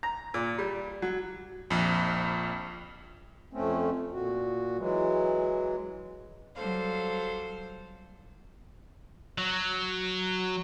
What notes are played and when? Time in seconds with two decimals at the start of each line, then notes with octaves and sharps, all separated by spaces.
0.03 A#5
0.34 A#2
0.59 G3
1.02 F#3
1.70 A#1 F2
3.53 F2 A3 C4 C#4
4.13 A#2 F#4
4.77 E3 F#3 G#3
6.55 F#3 G3 A4 C5 F5
9.38 F#3